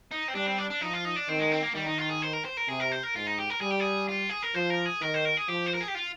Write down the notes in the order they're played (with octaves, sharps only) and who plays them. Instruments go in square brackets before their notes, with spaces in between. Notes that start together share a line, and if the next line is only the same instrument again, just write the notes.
[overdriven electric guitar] D#4
C4
[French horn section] G3 [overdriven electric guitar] D4
[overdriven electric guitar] C4
D4
D4
[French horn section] F3 [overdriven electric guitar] D#4
[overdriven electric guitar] F4
D#4
D4
[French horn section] D#3 [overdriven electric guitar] C4
[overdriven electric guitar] G#3
C4
A#3
[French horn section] D#3 [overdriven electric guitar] G3
[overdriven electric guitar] D#4
F4
G#4
C5
A#4
C5
A#4
[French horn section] C3 [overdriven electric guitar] G#4
[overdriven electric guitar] A#4
C5
A#4
[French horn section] G#2 [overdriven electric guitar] F4
[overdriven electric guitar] D#4
G4
A#4
[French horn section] G3 [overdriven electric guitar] G#4
[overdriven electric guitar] G4
G#4
F4
G#4
A#4
[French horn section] F3 [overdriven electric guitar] C5
[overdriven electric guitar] A#4
G#4
[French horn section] D#3 [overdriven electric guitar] A#4
[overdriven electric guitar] C5
A#4
G#4
[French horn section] F3 [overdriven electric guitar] G4
[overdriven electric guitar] C5
A#4
G#4
G4
F4